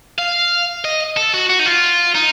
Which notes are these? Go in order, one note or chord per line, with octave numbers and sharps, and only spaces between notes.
F5
D#5
A4
F#4
F#4
D#4
F4
D#4